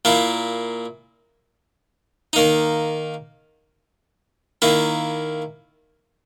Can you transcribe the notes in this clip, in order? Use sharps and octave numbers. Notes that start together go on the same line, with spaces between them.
A#2 A#3 E4
D#3 A#3 D#4
D#3 A#3 E4